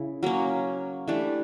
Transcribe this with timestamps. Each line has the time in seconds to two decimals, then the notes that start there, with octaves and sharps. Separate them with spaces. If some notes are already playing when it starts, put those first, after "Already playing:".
Already playing: C#3 E4
0.23 F#3 A#3 C#4
1.08 E3 A3 D4 G4